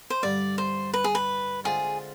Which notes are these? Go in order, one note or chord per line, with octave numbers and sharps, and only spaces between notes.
C5
G2 D3 G3 D5
C5
B4
G#4
B4
D3 G#3 C4 F4 G#4